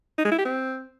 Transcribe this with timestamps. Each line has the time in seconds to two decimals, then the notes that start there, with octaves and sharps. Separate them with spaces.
0.18 D#4
0.25 G#3
0.32 E4
0.38 G4
0.45 C4